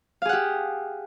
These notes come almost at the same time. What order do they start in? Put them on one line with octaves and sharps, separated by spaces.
F5 G#4 F#5 G4